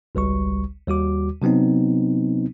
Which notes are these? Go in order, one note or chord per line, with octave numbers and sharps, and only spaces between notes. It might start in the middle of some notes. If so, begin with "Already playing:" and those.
G#1 C#2 G3 C#6
D#2 G3 F#4 D6
C3 F#3 B3 C4 D#4